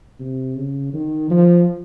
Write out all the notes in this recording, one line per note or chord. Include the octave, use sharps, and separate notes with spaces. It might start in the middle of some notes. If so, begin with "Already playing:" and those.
C3
C#3
D#3
F3